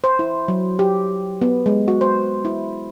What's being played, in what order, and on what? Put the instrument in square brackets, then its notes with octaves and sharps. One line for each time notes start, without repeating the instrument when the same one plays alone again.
[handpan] C5
E4
F#3
G4
B3
G#3
F#4
C5
E4